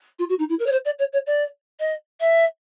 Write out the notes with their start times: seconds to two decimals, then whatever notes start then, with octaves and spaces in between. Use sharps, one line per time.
0.19 F4
0.29 F#4
0.38 D#4
0.49 E4
0.59 A#4
0.66 C#5
0.71 C5
0.85 D5
0.98 C#5
1.12 C#5
1.26 D5
1.79 D#5
2.20 E5